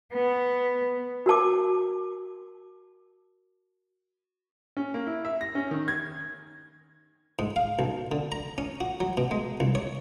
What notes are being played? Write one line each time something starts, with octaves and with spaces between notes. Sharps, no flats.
B3
F#4 A#4 A5 D6
C#4
A#3
E4
E5
A#6
C#4
D#3
G#6
G#2
F5
B1
D3
A#5
C#4
F#4
F#3
B2
G#3
C2
C#5